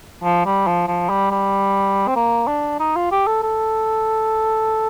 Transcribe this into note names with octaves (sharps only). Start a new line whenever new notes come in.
F3
G3
F3
F3
G3
G3
C4
A#3
D4
D#4
F4
G4
A4
A4